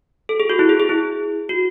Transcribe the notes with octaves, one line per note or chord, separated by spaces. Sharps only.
A4
G#4
F#4
E4
G#4
G#4
E4
F#4